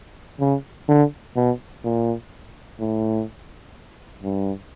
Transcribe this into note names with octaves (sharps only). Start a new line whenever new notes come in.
C#3
D3
B2
A#2
A2
G2